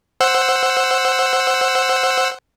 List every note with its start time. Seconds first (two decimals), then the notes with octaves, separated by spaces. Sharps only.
0.20 C5 F#5 E6